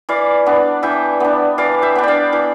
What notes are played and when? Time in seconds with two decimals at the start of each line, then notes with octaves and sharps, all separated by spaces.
0.09 E3 D5 F5
0.46 B3 D4
0.83 E3 E5 G5
1.20 B3 D4
1.58 E3 D5 F5
1.82 E5 G5
1.95 B3 D4
2.04 D5 F5 G5
2.33 E3